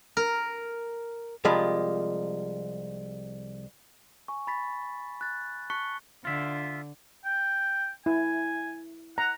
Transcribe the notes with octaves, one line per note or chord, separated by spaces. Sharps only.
A#4
C2 F3 G#3 F4 G4 B5
G#5 C#6
B5 A6 B6
F#6 A6
A5 C#6 F#6 B6 C#7 G7
D3 F4 E5
G5
E4 G#5
F#5 A#5